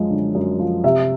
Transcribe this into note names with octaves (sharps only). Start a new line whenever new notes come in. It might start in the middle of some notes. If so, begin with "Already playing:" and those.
Already playing: F#2 F3 G#3
D3
F#2
F3
C3 E5